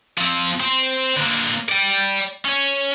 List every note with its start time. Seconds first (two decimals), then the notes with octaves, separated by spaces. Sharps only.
0.18 F3 C4
0.60 C4 C5
1.17 D3 A#3
1.69 D5 G5
2.45 C#4 C#5